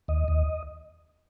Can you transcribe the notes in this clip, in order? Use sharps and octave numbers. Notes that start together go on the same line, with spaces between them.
D#2 D#5
D#2